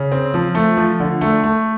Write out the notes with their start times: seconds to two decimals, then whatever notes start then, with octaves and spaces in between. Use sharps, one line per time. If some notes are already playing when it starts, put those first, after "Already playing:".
Already playing: C#3
0.12 C4
0.34 F3
0.55 A3
0.77 F3
1.00 D3
1.21 A3
1.44 A3